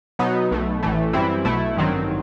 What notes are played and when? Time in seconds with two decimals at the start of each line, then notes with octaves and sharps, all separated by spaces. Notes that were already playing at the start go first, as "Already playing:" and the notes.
0.19 B2 F#3 B3 D#4
0.51 B1 B2 A3
0.83 A1 A2 E3 A3
1.13 F#2 E3 G3 C4 E4
1.45 B1 B2 A3 E4
1.76 A1 G2 D#3 F#3 C4